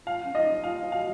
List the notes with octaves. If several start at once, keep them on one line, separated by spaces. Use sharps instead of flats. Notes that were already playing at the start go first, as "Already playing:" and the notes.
F4 F5
C#4
D#4 D#5
F4 F5
F4
F#4 F5